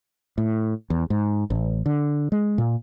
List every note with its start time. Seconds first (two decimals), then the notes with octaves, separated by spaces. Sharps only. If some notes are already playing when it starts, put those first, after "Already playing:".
0.38 A2
0.90 E2
1.10 G#2
1.50 A1
1.86 D3
2.32 G#3
2.58 A#2